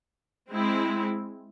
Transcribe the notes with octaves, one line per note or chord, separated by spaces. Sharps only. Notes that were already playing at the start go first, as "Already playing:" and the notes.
G#3 C4 E4